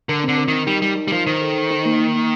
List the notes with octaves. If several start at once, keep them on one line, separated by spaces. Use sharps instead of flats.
D3 A#4
D3 C4
A#4
D#3 D#4
G3 D#4
G3 A#4
D#4
G3
F3 A#4
D#3 C5
A4
C5
D#4
A#3
A#3
A#3